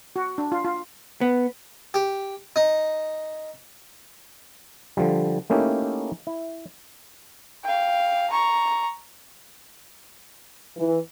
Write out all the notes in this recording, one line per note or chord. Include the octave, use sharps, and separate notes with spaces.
F#4
D4
F4
F4
B3
G4
D#4
D3 F3 G3
A3 A#3 C#4 D#4 E4 G4
E4
F5 G5
A#5 C#6
E3